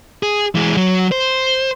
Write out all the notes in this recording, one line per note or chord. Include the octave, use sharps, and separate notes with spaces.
G#4
E3 G#3
F#3
C5